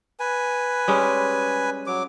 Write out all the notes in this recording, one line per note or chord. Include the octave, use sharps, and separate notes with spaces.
B4 G#5
G3 G#3 C#4
F#3 D6